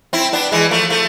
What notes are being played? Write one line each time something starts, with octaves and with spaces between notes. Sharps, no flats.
C4 E4
B3 D4
E3 G#3
F3 A3
F3 A3